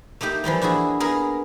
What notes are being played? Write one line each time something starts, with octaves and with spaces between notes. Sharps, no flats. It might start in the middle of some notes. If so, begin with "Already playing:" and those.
A3 A#3 D#4 G4
E3 F3 G3 A#3
D4 E4 F#4 G#4
A#3 B3 G#4 A#4